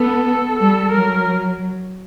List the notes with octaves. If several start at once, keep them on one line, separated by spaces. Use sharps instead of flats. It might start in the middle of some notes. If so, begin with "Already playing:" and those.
Already playing: B3 A4
G3 A4
F#3 A#4